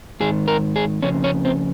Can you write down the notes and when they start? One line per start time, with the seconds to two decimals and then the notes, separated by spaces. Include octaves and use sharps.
0.20 G#2 D#3 G#4
0.48 A#4
0.76 G#4
1.02 F2 C#3 C#4
1.24 C#4
1.45 C4